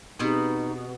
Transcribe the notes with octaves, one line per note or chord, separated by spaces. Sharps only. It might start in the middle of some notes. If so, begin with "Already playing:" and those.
B2 B3 C4 D#4 G4 G#4